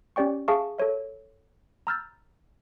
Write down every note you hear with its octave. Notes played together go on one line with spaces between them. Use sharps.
C#4 G4 D5 G5 C#6
G#4 E5 F5 A5 C#6
A4 A#4 C#5 E5
A#5 B5 E6 F6 G6 A6